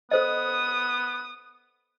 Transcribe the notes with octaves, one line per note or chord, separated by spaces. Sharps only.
B3 A4 C5 D#5 D#6